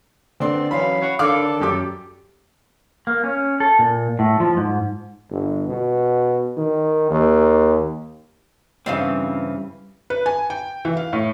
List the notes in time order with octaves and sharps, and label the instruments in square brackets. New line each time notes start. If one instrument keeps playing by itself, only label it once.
[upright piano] D3 C6 [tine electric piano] B3 C4 [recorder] D5
[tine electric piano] E3 F#3 C#4 [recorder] F5 [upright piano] B5
[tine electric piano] C#5 F#5 C#6
[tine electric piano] D3 D#3 [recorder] A4 [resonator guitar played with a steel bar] C#5 D5 F5 [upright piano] D6
[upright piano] F#2 G4 D6
[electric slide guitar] A#3
C#4
A4
A#2
A2
F3
G#2
[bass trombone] G1
B2
D#3
D#2
[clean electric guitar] G2 C#3 E3 [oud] C4 D#5 F5
[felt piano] B4
G#5
G5
E3
F5
A2